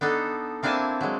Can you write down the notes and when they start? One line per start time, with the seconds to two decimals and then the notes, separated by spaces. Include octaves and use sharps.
0.01 B3 D4 D#4 A4
0.63 A#3 C4 D4 E4 G#5 A5
1.01 F#3 G#3